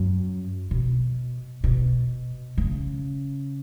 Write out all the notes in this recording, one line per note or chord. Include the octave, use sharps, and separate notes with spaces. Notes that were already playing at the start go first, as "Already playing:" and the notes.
Already playing: F#2
B2
B2
C#3